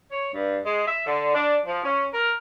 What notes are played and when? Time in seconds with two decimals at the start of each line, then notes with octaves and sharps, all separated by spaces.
0.11 C#5
0.32 G2
0.64 G#3
0.87 E5
1.07 D3
1.34 D4
1.66 F3
1.84 C#4
2.12 A#4